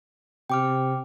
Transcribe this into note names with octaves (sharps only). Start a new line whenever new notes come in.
C3 G5 D6 F6